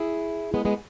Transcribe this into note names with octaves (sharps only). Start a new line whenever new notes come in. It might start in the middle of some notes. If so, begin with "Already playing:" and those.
Already playing: E4 G#4
G#3 B3
G#3 B3